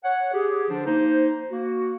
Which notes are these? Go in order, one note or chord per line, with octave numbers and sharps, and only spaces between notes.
C#5 F#5
G4 G#4
D3 F3 D4 C5
A#3 D#4 C5
A#3 F#4